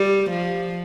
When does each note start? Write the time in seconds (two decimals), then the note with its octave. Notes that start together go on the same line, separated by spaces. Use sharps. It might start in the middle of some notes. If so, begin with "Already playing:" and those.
Already playing: G3
0.30 F3